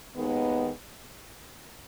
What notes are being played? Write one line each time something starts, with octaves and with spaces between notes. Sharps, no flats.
D#2 D#3 G#3 B3